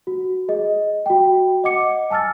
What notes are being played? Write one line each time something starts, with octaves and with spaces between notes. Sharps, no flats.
F#4
G#4 D#5
F#4 G5
D#5 F#5 D6 C#7
G#5 A5 E6 F6 A6